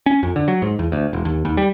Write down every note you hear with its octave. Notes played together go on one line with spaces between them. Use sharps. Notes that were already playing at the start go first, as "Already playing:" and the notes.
C#4
F2
D3
F#3
G#2
E2
D2
E1
D#2
D#2
G3